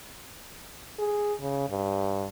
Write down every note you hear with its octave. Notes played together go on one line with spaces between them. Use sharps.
G#4
C#3
G2